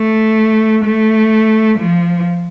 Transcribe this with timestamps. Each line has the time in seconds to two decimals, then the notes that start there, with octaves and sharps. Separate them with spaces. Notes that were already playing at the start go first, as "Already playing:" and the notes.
Already playing: A3
0.85 A3
1.78 F3